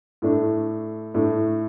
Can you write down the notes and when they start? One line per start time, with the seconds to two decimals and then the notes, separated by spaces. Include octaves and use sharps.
0.22 A2 A3 D4
1.14 A2 A3 D4